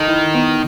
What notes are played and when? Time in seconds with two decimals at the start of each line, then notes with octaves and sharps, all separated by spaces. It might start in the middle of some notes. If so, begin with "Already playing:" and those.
Already playing: D#3 A4
0.08 E4
0.35 B3